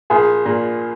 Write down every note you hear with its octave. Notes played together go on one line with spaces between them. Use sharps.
A#1 G#4
A#2